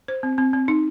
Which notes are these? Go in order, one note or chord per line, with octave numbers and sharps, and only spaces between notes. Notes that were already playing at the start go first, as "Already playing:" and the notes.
C5
C4
C4
C4
D#4